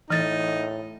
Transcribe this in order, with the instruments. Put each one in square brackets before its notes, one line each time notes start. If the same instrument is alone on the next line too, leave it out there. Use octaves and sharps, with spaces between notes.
[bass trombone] A2 [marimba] E3 A6 [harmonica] D#4